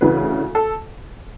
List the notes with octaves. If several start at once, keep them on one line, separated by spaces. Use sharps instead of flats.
D2 C#3 E3 B4
A4